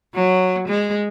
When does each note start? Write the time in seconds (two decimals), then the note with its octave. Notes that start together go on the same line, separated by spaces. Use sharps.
0.15 F#3
0.68 G#3